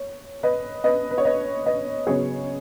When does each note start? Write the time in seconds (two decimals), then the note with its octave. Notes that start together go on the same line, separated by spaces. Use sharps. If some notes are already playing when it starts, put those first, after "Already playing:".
Already playing: C#5
0.43 B4 D#5
0.84 B4 D#5
1.11 B4
1.18 C#5
1.25 B4 D#5
1.66 B4 D#5
2.07 C#3 F#3 B3 G#4 C#5